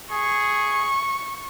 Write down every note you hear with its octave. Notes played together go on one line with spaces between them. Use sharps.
G#4 C#6